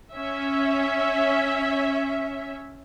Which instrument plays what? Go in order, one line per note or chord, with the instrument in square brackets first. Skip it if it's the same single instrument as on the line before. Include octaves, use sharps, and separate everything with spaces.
[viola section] C#4 E5